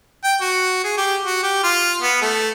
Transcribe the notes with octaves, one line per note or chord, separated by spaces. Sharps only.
G5
F#4
G#4
G4
F#4
G4
F4
B3
A3